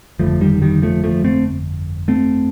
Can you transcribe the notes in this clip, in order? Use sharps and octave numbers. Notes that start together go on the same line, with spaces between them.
G1 F2 D3 F3 A3
D#3 G3
D#3 G3
F3 A3
F3 A3
A3 C4
A3 C4